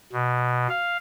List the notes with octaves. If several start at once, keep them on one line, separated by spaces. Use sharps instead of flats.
B2
F5